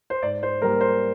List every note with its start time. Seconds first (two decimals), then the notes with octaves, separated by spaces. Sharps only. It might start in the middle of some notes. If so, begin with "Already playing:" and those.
0.10 C5
0.22 G#2 D5
0.43 C5
0.61 G3 A#3 A#4
0.81 C5